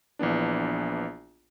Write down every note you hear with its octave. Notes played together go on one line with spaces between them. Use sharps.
A#1 E3 B3 D4